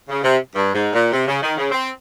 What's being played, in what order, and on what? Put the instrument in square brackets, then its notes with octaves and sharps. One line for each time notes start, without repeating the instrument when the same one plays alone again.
[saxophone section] C#3
C3
G2
G#2
A#2
C3
C#3
D#3
C#3
C4